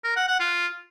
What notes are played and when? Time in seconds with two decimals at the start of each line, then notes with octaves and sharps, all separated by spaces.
0.04 A#4
0.16 F#5
0.28 F#5
0.40 F4